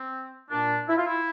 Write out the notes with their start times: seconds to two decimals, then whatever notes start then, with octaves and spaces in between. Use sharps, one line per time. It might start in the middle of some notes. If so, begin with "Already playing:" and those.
Already playing: C4
0.50 A#2 D4
0.88 E4
0.97 F4
1.06 E4